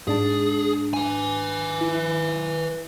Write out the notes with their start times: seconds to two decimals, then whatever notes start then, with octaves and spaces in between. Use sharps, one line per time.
0.08 G#2 D4 G#4 A5
0.94 B4 G#5
1.81 E4